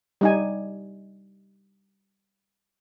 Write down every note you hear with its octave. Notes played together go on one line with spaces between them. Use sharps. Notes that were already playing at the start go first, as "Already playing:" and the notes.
G3 D#4 G#5